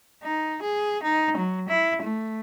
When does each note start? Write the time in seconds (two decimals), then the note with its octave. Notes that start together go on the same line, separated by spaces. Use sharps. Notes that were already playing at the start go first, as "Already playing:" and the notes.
0.23 D#4
0.62 G#4
1.03 D#4
1.37 F#3
1.69 E4
2.02 A3